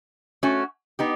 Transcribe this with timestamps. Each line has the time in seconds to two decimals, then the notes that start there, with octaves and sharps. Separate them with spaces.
0.43 A3 C#4 F#4
0.99 B3 D#4 G4